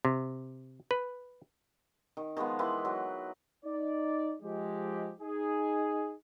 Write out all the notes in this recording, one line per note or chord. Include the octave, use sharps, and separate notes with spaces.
C3
B4
D#3
D#3 F3 G#3 B3
D#3 E3 B4 C6
F#3
D#4 D5
F3 G#3 G4
D#4 G#4